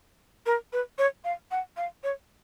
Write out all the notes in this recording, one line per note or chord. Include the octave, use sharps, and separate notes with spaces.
A#4
B4
C#5
F5
F#5
F5
C#5